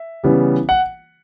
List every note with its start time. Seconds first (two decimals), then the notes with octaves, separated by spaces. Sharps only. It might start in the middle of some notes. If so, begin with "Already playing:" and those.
Already playing: E5
0.24 C#3 E3 G3 B3
0.69 F#5